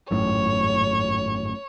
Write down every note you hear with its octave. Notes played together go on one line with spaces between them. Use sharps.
G#1 F#2 A2 C#5